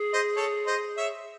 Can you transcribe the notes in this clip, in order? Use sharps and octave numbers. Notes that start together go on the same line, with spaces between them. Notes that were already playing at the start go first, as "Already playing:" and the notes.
Already playing: G#4
C5 D#5
A4 C#5
C5 D#5
C#5 E5